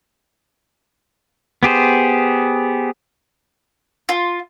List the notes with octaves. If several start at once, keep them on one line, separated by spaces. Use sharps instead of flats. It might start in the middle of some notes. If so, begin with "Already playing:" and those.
B3 G4 G#4 C5
F4